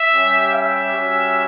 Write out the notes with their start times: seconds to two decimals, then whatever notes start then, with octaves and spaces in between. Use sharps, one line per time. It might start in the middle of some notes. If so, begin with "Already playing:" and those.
Already playing: E5
0.11 G3 C#4 G4
0.52 E5
0.93 G3 C#4 F#4